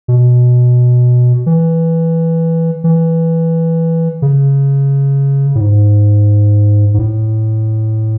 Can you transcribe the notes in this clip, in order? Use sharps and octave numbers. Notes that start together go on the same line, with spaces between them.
B2
E3
E3
C#3
A2
G#2
G#2
A2